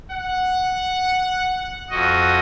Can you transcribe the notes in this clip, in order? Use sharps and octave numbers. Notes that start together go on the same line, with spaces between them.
F#5
F2 F#4 D#5